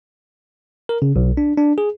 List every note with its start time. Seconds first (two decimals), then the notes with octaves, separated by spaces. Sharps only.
0.89 A#4
1.02 C#3
1.16 B1
1.37 D4
1.57 D4
1.78 G#4